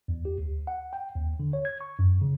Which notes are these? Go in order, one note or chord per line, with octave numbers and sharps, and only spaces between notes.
E2
G4
D2
F#5
G5
D#2
D3
C#5
G#6
C#6
F#2
C#3